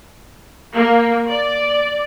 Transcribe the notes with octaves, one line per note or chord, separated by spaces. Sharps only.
A#3
D5